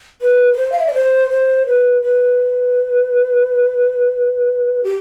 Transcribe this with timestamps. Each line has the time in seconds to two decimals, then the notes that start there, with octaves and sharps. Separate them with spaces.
0.22 B4
0.54 B4
0.57 C5
0.72 F5
0.79 E5
0.87 D5
0.94 C5
1.30 C5
1.67 B4
2.02 B4
4.84 G4